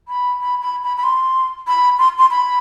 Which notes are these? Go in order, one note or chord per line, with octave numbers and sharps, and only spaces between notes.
B5
B5
B5
B5
B5
C6
B5
C6
C6
B5